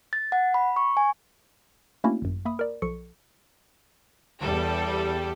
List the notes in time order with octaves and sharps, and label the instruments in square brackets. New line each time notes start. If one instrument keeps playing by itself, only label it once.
[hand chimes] A6
F#5
B5
C#6
G#5
[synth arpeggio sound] A3 A#3 C#4 D4 E4 F#4
G#1 F#2
A#3 E5 B5 D#6
A#4 D5
B1 F3 A4 C#6 C#7
[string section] E2 G3 A4